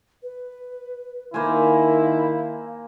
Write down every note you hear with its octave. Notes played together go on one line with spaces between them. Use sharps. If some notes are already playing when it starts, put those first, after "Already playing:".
B4
D#3 A#3 E4 C5 F5 G#5